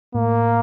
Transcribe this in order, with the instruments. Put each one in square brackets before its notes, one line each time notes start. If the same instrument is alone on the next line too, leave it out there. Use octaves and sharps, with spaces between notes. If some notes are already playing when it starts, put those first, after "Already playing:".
[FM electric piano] A2 [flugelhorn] A#3